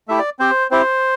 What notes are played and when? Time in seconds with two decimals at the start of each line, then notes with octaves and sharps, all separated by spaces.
0.08 A3 E4 G4 E5
0.19 D5
0.39 C4 G4 C5
0.71 C4 E4 G4 C5